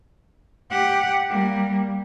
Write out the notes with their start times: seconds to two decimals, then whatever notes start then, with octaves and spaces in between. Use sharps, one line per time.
0.70 G4 F#5
1.29 G3 A#3